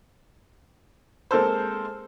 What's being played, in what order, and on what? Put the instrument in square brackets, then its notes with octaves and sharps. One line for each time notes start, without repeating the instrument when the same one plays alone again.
[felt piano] G#3 A#3 C4 A4 C5